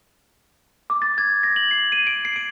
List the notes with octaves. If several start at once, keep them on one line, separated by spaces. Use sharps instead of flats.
D6
A6
G#6
A#6
F#7
C7
D#7
D7
C7
D7